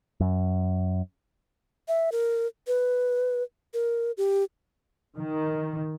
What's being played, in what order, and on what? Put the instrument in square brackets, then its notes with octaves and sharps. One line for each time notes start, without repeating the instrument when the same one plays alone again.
[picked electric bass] F#2
[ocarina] E5
A#4
B4
A#4
G4
[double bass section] D#3